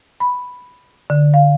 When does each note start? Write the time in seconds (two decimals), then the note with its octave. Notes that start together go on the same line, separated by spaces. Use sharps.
0.20 B5
1.10 D3
1.34 F5